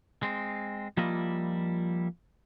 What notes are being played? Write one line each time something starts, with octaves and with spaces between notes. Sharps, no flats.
G#3 C4
F3 G3 A#3 E4 F4 D#5